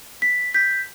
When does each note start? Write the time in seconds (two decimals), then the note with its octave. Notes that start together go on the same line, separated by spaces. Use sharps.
0.22 B6
0.54 G6 B6